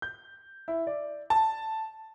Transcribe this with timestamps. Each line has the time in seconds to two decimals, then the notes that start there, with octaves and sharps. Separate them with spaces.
0.02 G6
0.68 E4
0.87 D5
1.30 A5